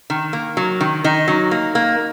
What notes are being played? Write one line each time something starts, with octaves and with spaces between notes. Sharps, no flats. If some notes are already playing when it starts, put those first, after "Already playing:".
D#3
A#3
F#3
D#3
D#3 D#4
F#3
A#3
A#3